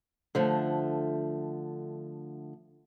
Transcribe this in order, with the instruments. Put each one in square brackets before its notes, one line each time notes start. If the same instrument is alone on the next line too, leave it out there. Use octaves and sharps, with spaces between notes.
[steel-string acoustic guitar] D3 F3 A3